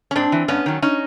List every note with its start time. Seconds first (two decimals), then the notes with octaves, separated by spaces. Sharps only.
0.11 C#4
0.15 G#2 C4 D4
0.32 E3
0.48 G2 B3 C#4
0.66 D#3 F#3
0.82 C#4 D#4